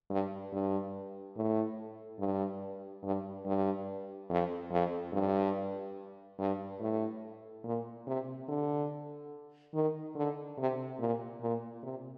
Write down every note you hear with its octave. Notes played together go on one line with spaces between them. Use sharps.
G2
G2
A2
G2
G2
G2
F2
F2
G2
G2
A2
A#2
C3
D3
D#3
D3
C3
A#2
A#2
C3